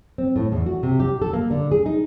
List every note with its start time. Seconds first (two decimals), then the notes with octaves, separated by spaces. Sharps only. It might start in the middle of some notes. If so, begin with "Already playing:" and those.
0.18 C4
0.36 A2
0.52 E2
0.66 F#4
0.83 C3
1.00 G4
1.22 A4
1.33 A#3
1.51 D3
1.71 G#4
1.86 D#4